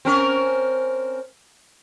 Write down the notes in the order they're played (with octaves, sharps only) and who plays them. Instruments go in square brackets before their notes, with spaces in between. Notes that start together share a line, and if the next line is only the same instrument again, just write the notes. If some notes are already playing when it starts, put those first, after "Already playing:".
[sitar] C4 C#4 A#4